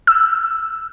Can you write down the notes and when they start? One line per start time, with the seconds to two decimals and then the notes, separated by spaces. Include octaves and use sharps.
0.07 E6